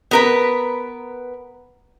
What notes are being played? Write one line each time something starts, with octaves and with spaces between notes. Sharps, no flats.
B3 A#4 B4